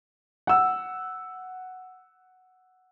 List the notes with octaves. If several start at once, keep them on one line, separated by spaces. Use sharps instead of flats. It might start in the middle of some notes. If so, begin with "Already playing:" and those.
F#5 E6